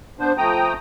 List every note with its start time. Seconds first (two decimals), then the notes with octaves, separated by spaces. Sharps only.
0.19 B3 D4 C5
0.38 F3 A3 G5 A#5 D#6